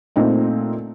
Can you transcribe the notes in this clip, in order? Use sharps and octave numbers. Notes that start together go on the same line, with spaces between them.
A#2 A3 C4 D#4